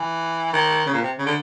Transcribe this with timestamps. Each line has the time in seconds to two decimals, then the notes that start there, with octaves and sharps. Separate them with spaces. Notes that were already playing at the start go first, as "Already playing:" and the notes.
Already playing: E3
0.53 D#3
0.86 C#3
0.93 A#2
1.02 C3
1.19 C#3
1.26 D3